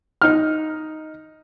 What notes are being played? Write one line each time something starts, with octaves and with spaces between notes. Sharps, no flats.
D#4 F6